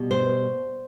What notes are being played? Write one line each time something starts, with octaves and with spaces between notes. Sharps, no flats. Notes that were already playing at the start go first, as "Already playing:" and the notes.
Already playing: B2 G3
C5